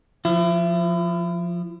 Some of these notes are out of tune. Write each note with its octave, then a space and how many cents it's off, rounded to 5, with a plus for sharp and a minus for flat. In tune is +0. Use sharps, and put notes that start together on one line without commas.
F3 +0 E4 +35